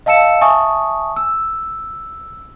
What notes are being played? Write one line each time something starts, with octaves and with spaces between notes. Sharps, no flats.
D#5 F5 A5 E6 C#7 E7
E5 G#5 A5 C#6 D#6
E6